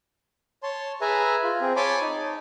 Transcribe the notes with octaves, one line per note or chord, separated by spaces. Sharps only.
C#5 A5 C6
G#4 B4 E5 G#5 A#5
F4
C4 G#4
C#5 G#5 A5 B5 C6 D6
D#4